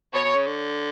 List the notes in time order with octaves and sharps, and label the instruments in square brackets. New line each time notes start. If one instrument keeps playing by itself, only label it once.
[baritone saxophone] B2 [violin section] C#5
[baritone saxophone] B2
C#3
D3